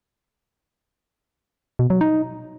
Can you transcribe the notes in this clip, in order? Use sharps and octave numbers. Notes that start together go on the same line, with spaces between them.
B2
F#3
D#4